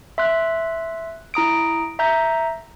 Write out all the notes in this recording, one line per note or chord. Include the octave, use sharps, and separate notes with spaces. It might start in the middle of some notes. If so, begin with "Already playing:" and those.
E5 C6 F#6
E4 A#5 D#6 D7
E5 A#5 G6